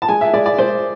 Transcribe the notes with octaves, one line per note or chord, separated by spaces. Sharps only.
A5
G#3 G#5
E5
G#3 D5
D5
G#3 C5